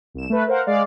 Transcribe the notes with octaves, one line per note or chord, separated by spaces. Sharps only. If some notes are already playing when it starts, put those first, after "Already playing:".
C2 E7
A3 B4
A#4 C5 F5 F#5
G#3 D5 F5